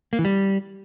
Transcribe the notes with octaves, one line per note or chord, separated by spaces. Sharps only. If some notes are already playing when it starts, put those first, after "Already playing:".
A#3
E3
G3